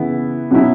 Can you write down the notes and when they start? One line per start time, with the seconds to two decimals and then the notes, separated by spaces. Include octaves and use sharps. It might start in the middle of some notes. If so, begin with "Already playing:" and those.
Already playing: C#3 E3 B3 E4
0.51 B2 F#3 C#4 E4